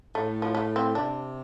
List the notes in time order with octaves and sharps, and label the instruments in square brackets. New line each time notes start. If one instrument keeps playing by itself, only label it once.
[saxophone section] A2 [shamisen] A3
[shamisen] F3
A3
C4
[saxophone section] C3 [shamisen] D4